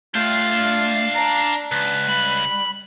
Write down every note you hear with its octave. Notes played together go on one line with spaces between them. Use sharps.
A3 D4 F4 F5 G5
D5 A5 A#5
C#2 B4
G3 B5